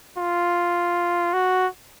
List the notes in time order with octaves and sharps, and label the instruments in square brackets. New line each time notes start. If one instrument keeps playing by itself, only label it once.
[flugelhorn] F4
F#4